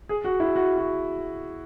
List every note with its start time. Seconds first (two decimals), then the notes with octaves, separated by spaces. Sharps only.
0.09 G#4
0.24 F#4
0.40 E4
0.55 F#4
0.78 F#4